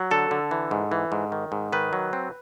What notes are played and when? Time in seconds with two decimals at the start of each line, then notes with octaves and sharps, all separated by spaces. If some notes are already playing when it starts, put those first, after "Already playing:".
Already playing: F#3
0.11 D3 A4
0.31 D3
0.51 E3
0.71 G#2
0.91 E3
1.12 G#2
1.32 D#3
1.52 G#2
1.73 D#3 B4
1.93 F#3
2.13 C4